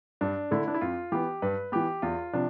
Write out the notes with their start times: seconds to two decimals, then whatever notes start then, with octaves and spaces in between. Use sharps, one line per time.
0.21 G2 D4
0.51 D3 A3 E4
0.68 D4
0.74 E4
0.81 F2 F4
1.12 E3 B3 G4
1.42 G2 B4
1.72 E3 B3 G4
2.02 E2 F4
2.33 C3 F3 D4